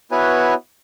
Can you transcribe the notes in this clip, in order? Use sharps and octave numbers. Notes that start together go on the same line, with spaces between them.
B3 E4 F#4 B4 C#5 G#5